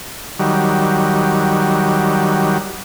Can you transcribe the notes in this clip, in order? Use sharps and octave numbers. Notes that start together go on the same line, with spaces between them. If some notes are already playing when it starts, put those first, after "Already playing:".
D#3 F#3 G3